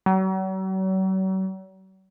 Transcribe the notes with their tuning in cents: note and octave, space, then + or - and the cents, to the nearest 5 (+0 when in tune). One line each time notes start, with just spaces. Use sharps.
F#3 +45